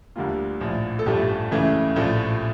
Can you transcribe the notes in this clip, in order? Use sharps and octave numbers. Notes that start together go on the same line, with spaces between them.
D2 D3 G3 A#3 F4
A#1 A2 F3
A4
A1 G2 F3 A3 G4
C#2 C#3 E3 A3
A#1 A2 F3 A3